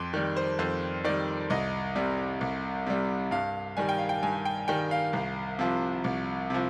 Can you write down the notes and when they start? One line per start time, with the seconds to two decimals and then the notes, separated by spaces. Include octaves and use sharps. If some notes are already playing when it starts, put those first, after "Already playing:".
Already playing: F2 C6 D6
0.13 D#3 G3
0.36 C5
0.59 F2 C5
1.04 D#3 G3 D5
1.50 C2 D#5
1.95 C3 G3
2.41 C2
2.86 C3 G3
3.31 G2 F5
3.77 D#3 G3 G#5
3.89 G5
3.98 F5
4.09 G5
4.23 G2 G#5
4.45 G5
4.68 D#3 G3 G5
4.91 F5
5.13 C2
5.59 C3 F3
6.04 C2
6.50 C3 F3